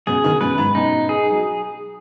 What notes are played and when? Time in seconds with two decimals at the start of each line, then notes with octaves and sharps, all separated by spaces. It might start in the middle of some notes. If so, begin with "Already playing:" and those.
0.07 F#2 B2 G#4
0.24 B2 D#3
0.41 F#2 B2 B4
0.58 G#2
0.75 F#2 B2 D#4
1.09 G#4
1.32 F#3